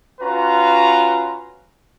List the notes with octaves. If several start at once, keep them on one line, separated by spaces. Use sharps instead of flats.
C#4 F4 F#4 B4 A#5